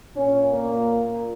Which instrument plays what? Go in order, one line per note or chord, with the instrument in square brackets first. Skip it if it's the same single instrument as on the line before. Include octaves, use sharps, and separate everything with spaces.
[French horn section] A#2 C#4
A#3